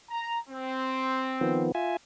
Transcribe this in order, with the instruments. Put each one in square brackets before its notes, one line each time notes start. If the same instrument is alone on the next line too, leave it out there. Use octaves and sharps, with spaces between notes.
[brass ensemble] A#5
C4
[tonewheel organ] D#3 F3 B3
F4 E5 G#5